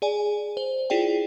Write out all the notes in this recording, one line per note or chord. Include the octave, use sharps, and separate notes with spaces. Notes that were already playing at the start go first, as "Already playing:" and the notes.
G#4 D5 G#5
C5
E4 F4 G#4 D5 G5